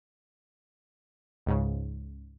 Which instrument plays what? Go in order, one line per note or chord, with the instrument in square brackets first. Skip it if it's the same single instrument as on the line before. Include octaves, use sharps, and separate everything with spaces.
[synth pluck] C#2 G#2 C#3